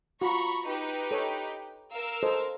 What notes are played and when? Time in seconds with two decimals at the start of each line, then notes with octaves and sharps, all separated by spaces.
0.21 F4 F#4 A#5 B5 C#6
0.67 D#4 G4 B4
1.11 A4 C#5
1.92 A#4 F5 E6
2.23 A4 C5 D#5